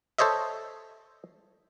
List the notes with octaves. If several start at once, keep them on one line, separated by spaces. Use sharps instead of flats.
A4 C5 C#5 D#5 E5